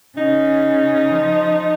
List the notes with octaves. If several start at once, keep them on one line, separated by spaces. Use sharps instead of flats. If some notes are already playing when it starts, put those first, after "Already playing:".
C#3 D#4
F3